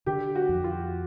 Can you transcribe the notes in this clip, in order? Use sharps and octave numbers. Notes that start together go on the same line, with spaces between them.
D3 G4
F#4
F2
F4